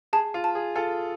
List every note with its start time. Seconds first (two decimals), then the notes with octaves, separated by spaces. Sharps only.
0.13 G#4 A5
0.34 F4
0.44 A5
0.55 G#4
0.76 F4 A4 G#5